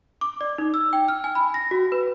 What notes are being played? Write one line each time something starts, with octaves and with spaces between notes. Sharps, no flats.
D6
D5
D#4
E6
G5
F6
G#5
B5
A#6
F#4
B4